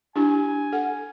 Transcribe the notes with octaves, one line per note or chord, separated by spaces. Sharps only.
D4 E4 G4 G#5
A4 F#5